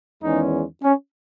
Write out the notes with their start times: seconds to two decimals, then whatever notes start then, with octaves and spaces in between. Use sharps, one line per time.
0.22 E2 D#3 G#3 C#4 D#4
0.83 C#4